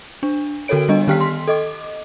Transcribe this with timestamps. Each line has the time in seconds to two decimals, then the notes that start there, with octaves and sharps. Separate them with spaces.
0.23 D4
0.68 D3 F#4 A4 A#4 C#5 D7
0.88 G3 B3 D4 D#5
1.08 D#3 B3 G4 G5 F6 B6
1.21 C6
1.47 A4 D#5 D6